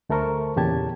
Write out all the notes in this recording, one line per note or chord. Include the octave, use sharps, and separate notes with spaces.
D2 A3 A4 A#4 C5 C#6
E2 A#2 C#3 G4 A5 G#6